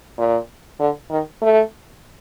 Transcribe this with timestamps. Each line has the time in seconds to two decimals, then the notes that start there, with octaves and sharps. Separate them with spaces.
0.18 A#2
0.79 D3
1.10 D#3
1.42 A3